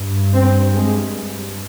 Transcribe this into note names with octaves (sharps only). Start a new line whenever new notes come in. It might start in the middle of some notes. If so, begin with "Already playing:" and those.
Already playing: G2
C4
G#3